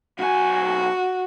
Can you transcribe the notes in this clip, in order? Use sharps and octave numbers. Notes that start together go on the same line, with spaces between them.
B1 F#4 G#5